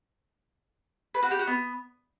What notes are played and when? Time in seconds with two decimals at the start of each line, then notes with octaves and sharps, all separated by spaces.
1.14 B4
1.23 F#4
1.31 G4
1.39 F#4
1.47 B3